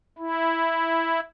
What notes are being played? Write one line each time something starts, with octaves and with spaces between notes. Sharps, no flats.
E4